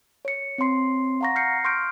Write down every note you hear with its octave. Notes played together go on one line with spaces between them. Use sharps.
C#5 C#7
C4 C#5 C6 C7
F5 F#5 A#5 C#6 A#6
F6 G6 A#6 C7 C#7
C6 C#6 F6 G6 D7